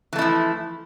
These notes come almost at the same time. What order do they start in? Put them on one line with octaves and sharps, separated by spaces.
E3 A3 E4 F3